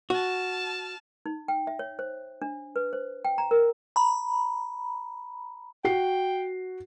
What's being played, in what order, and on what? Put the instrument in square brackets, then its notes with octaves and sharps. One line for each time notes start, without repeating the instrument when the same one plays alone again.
[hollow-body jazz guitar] F#4 [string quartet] A5 F6
[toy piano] D#4
G5
E5
C#5
C5
D4
B4
C5
G5
A#5
A#4
[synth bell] A#5 B5
[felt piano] F#4 C7 [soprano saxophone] G5